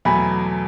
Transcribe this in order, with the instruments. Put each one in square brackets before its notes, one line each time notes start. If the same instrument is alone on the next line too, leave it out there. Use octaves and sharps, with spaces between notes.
[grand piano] E2 B2 F#3 A3 [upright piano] G#5 B5